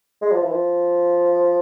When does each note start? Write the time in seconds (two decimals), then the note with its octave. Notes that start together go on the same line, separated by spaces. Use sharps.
0.22 G#3
0.32 F3
0.42 E3
0.52 F3